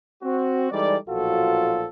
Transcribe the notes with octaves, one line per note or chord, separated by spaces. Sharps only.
C4 F#4
E3 G3 G#3 D#4 A4 D5
B1 A#2 F3 F4 F#4 A4